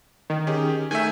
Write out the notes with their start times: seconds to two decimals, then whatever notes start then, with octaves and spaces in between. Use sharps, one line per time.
0.30 D#3
0.47 C#4 G4 G#4
0.91 D#3 A3 E5 G#5